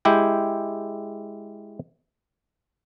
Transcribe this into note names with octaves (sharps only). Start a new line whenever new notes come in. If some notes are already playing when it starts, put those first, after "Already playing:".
G#3 E4 G4 G5